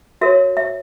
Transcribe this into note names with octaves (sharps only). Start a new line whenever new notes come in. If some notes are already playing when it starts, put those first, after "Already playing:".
F#4 A#4 C#5 E5
E5